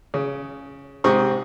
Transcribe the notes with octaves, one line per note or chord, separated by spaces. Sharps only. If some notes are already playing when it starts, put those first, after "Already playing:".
C#3
G#2 C3 C5 C#6 D#6